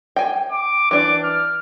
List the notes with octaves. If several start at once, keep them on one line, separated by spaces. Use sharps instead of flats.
G5 G#5
D6
E3 D4 D6
F6